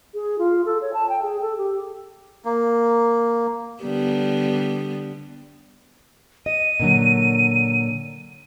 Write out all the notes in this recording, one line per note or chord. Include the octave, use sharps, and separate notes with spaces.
G#4
F4
A4
C#5
A5
G5
G#4
A4
G4
A#3
D3 G3 B3
D#5 D#7
A#2 D3 F#3